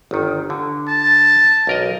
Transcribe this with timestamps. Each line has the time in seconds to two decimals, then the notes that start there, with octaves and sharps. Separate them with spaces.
0.11 G1 D#3
0.50 D3
0.88 A5
1.67 B1 A#4 D#5